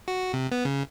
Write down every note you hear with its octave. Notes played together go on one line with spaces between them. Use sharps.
F#4
C3
B3
C#3